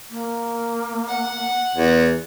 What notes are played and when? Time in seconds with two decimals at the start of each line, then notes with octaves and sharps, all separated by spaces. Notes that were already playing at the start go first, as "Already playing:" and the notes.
0.10 A#3
1.07 F#5
1.75 E2